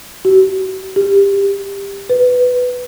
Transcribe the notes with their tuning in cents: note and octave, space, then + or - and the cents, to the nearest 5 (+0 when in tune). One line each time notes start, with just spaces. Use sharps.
F#4 +40
G4 +20
B4 +5